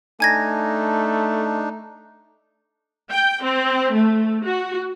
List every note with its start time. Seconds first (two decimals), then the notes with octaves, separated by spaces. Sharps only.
0.20 A3 D4 D#4 G#5 G#6 A#6
3.11 G5
3.43 C4
3.94 A3
4.44 F#4